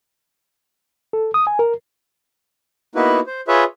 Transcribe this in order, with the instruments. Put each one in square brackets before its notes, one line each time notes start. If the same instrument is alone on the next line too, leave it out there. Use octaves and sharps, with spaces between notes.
[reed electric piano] A4
D#6
G#5
A#4
[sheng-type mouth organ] A#3 B3 D#4 E4 F#4 B4
C5
F4 G#4 B4 C#5 E5